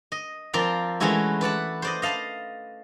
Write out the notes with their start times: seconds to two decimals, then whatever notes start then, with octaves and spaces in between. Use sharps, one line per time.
0.12 D#5
0.53 F3 C4 A#4 D5 F5 B5
1.00 E3 G#3 A3 C#4 E4 F#4
1.41 B4 D5 F#5 A5
1.82 C5 D5 D#5
2.02 D#5 F5 A5 B5